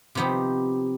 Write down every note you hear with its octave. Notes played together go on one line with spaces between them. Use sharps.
C3 F3 B3 D#4 G4